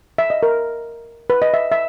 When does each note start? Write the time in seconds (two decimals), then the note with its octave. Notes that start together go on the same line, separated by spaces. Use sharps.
0.18 E5
0.30 D#5
0.43 A#4
1.30 B4
1.42 D#5
1.54 E5
1.72 E5